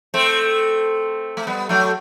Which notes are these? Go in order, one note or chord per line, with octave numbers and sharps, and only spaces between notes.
A3 C4
A3
G3 B3
F#3 A3